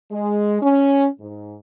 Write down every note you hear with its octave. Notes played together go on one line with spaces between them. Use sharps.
G#3
C#4
G#2